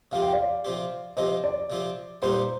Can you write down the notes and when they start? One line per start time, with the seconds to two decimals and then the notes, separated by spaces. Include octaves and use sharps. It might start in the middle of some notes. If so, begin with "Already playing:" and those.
0.12 C3 F3 C4 G4 F5
0.22 G5
0.33 D5 F5
0.65 C3 F3 C4 G4
1.17 C3 F3 C4 G4 C5 D#5
1.44 D5
1.70 C3 F3 C4 G4
2.22 A#2 G3 C4 D#4 G4 C5